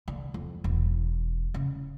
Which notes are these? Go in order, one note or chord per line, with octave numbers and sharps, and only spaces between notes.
D3
F2
E1
C#3